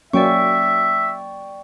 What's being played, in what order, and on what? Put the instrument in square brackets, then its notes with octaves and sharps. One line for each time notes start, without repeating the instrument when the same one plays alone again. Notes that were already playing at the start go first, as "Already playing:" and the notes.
[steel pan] F#3 A#3 C#4 [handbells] D5 G5 C#6 [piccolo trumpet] E5